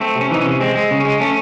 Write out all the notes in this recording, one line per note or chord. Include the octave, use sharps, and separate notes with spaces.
A3 C4
C3
C#4
E3 D#4
C#4
C3
G#3 C4
G#3
C#3
C#4
G#3
A3 C#4